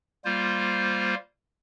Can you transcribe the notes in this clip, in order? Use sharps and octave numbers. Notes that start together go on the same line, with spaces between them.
G3 A#3 F4 C5